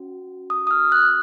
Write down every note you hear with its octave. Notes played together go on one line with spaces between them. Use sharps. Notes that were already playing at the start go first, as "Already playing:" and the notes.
Already playing: C#4 F#4
D#6
D#6
F6
F#6